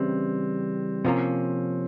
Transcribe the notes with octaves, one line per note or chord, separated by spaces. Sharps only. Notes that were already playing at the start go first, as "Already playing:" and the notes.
Already playing: C#3 E3 G3 C4
C3 F3 A#3 C4 C#4